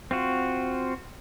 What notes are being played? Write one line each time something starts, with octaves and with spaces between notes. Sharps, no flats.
C4 F4 F#4